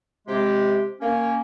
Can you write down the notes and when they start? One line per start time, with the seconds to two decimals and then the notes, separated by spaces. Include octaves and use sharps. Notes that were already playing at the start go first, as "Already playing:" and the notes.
0.28 C3 G#3 G4
1.01 A#3 C#4